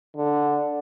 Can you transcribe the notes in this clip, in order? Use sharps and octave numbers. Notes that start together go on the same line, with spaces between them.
D3